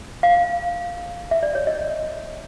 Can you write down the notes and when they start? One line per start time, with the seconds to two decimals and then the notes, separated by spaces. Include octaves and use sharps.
0.23 F5
1.31 E5
1.43 D5
1.55 C#5
1.67 D#5